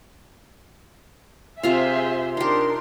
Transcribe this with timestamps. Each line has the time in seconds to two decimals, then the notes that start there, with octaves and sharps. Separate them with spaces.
1.63 C3 F4 G#4 C5 E5 F5
2.37 D4 D#4 G4 A#4 C6